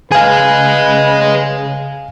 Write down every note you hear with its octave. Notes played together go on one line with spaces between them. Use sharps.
C#3 G#4 B4 D#5 F5 G#5